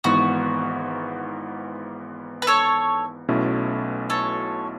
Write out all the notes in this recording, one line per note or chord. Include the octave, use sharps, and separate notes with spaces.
G#1 G#2 E3 B3 F#4
B4
A4 C#5
B1 B2 A3 C#4 E4
A4 C#5